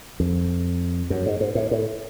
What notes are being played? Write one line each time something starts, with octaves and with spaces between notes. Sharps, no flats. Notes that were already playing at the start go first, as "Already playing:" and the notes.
F2
F#2
G#2
G#2
A2
A2